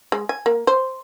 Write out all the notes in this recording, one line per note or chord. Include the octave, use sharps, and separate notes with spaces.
G#3
G#5
A#3
C5